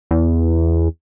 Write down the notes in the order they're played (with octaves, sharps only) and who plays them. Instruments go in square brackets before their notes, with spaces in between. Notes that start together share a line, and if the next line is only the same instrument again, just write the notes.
[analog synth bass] E2